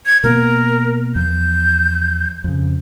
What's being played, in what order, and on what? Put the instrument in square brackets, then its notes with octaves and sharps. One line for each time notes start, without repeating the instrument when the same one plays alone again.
[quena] G#6
[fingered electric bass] B2 A#3 B3 [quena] A#4
[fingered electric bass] E2 F3 [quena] G6
[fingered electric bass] F2 C#3